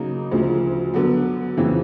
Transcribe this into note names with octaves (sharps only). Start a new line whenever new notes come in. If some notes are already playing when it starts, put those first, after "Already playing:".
Already playing: C#3 F#3 A#3 D#4
D2 C#3 F3
D3 F#3 B3
F2 C#3 E3